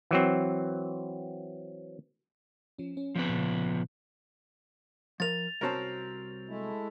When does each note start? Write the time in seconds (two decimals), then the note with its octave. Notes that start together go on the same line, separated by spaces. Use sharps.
0.11 E3 F#3 C4
2.78 F3 C#4
2.97 C#4
3.15 F3 B3 C4 B4
3.29 A#2 C#3
5.20 F3 A#4 A6 F7
5.61 C2 C4 C#4 F#4 A#4 A5
6.49 G#3 A3 E4